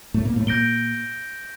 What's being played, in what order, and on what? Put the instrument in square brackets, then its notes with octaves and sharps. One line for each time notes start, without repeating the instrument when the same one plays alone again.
[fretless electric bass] A2 A3
A#2 A#3
A2 A3
[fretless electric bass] A#2 A#3 [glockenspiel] G6 A#6 D7 G7